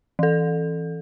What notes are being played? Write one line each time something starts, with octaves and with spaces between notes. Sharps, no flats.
E3 A4